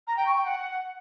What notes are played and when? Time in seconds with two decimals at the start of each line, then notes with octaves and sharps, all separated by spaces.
0.08 A#5
0.17 G5
0.26 C#6
0.36 G5
0.45 F#5